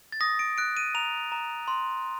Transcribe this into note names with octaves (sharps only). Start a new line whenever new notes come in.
A6
D#6 A#6
D7
F#6 D7
D#7
A#5 F7
A#5
C6